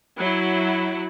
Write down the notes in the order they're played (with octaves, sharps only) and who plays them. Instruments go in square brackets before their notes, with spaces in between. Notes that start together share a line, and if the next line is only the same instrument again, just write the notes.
[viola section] F#3 E4